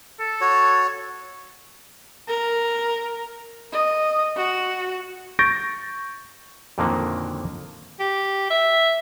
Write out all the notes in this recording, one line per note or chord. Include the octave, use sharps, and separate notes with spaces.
A4
F#4 C#5
A#4
D#5
F#4
C#6 G6 A6 A#6 D7
F2 A#2 D3 D#3 F#3 A#3
G4
E5